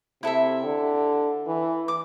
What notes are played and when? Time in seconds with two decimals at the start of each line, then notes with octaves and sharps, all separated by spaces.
0.23 C3 E4 A4 E5
0.64 D3
1.47 E3
1.88 D6